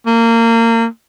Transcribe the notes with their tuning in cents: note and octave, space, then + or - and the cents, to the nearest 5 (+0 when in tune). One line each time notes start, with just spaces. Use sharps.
A#3 -25